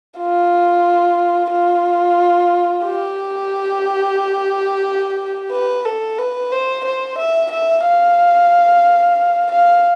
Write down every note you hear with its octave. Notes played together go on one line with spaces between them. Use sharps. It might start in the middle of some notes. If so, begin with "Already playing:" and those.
F4
F4
G4
B4
A4
B4
C5
C5
E5
E5
F5
F5